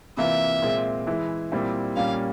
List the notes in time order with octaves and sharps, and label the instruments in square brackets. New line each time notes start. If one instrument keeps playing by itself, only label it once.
[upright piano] C3 E3 A#3 F4 [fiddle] E5
[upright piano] A#2 G#3 C4
E3 G#3 E4
A#2 G3 C4 E4
[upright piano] A#2 G3 A#3 C#4 F4 [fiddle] F5